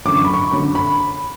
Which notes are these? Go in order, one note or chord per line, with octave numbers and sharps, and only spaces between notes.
F#2 D3 F#3 D6
C#6
B5
C#6
F#2 D3 F#3 B5
B5